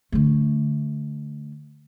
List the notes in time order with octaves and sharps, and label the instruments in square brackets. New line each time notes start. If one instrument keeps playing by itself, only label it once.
[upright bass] D3 A3